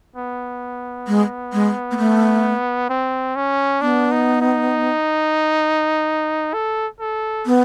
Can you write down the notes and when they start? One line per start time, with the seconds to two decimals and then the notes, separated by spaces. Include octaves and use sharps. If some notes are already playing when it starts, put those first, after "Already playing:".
0.16 B3
1.07 G#3
1.53 G#3
1.91 A#3
1.98 A3
2.90 C4
3.36 C#4
3.81 B3 D4
4.11 D#4
4.41 D#4
6.54 A4
7.00 A4
7.46 B3